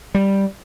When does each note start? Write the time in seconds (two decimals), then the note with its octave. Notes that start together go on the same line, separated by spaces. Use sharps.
0.14 G3